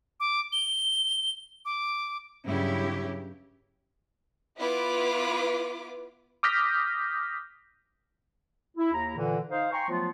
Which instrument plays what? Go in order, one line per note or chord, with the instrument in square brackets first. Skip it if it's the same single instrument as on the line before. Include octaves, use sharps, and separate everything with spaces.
[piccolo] D6
G7
D6
[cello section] G2 C#3 F#3 E4 G4
[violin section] B3 E4 F4 B4 D6
[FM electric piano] D6 D#6 F6 G6 A#6 B6
[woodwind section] E4
D#2 E4 A#5
A#2 D3 E3
D#4 C5 F5
G5 G#5 A#5 C6 C#6
F3 F#3 A3 B3 F4